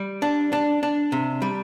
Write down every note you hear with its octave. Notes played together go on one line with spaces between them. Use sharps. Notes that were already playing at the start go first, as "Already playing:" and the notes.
Already playing: G3
D4
D4
D4
C3
G3